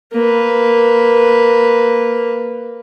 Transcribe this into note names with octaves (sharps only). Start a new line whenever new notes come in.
A#3 B4